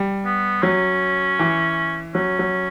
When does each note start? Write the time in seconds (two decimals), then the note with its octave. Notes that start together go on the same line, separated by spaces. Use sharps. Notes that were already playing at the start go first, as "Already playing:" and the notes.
Already playing: G3
0.25 B3
0.63 F#3 C#4
1.39 E3
2.14 F#3 C#4
2.39 F#3